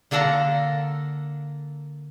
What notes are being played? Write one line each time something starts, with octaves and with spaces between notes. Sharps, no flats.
D3 A#3 D4 A4 F#5 A#5